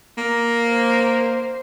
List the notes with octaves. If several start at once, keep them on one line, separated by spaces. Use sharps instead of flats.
A#3
C5